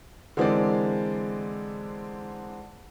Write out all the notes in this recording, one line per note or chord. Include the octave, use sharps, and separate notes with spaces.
D3 E3 G#3 C4 A#4 D5